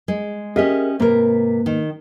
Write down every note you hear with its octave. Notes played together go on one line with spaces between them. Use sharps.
G#3
C#4 G4 G#4 A#4 D#5 E5
G#2 C3 A#3 A#4 B4
D#3